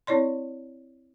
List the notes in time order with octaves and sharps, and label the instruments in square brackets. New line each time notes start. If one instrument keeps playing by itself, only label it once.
[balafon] C4 E4 C#5 D5 C6